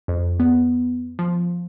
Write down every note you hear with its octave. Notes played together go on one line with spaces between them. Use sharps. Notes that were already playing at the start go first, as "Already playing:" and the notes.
F2
B3
F3